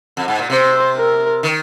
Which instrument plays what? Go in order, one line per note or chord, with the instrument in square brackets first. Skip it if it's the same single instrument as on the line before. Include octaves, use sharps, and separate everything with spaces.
[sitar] F2
G#2
A#2
[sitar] C3 [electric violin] C5
[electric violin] A#4
[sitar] D#3